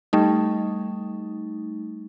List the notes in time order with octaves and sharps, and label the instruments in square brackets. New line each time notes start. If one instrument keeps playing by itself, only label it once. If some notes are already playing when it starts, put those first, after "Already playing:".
[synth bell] G3 A3 D#4